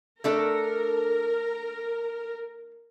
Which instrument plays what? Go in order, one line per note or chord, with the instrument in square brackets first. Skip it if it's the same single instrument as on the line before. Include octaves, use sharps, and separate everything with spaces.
[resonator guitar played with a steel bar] A3 D4 A4 [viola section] A#4